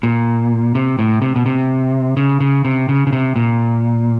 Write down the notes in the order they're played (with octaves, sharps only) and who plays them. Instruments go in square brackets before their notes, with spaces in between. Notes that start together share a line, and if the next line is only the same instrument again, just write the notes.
[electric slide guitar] A#2
C3
A2
C3
B2
C3
C#3
C#3
C3
C#3
C#3
C3
A#2